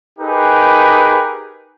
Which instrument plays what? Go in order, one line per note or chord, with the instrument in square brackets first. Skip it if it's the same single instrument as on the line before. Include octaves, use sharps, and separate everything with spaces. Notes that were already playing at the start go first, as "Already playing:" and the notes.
[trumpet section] D#4 G4 G#4 A#4 B4